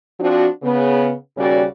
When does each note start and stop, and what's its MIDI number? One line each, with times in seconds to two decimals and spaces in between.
0.19 0.47 53
0.19 0.47 60
0.19 0.47 62
0.19 0.47 66
0.63 1.13 49
0.63 1.13 59
1.37 1.64 39
1.37 1.64 49
1.37 1.64 55
1.37 1.64 61
1.37 1.64 66
1.37 1.64 74